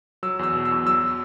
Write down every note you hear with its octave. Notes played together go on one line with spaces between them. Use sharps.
F#3 E6
E2 E6
B2
E6
E2
F#3 E6